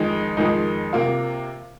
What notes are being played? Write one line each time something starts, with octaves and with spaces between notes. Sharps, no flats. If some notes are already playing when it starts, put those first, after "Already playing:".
Already playing: F2 D#3 G#3 D#4
F2 D#3 G#3 D#4
C3 A#3 F4